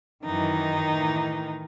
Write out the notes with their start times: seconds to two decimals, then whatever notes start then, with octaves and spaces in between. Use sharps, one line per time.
0.24 F#2 D#3 E3 D#4
0.89 A2 E3